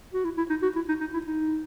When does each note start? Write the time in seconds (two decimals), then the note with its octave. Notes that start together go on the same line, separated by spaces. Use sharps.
0.14 F#4
0.25 E4
0.37 E4
0.50 D#4
0.63 F#4
0.76 E4
0.89 D#4
1.01 D#4
1.14 E4
1.26 D#4